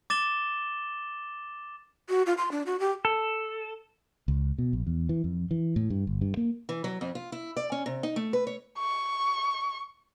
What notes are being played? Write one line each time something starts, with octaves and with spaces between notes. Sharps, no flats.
D6 A6 E7 G7
F#4
F4
C6
D4
F#4
G4
A4
C#2
B2
A#1
E2
E3
F2
E3
A2
G2
G1
G2
A#3
E3
F#3
F2
F4
E4
D5
C#4
C3
D#4
A3
B4
C#5
C#6